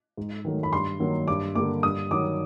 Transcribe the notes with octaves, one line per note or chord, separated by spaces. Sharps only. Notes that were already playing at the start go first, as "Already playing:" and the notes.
G#2
D#3 F#3 A3
B5
G2 C6
D#3 F#3 A#3
G2 D6
D3 G3 A#3 D6
G2 D#6
D#3 F#3 D6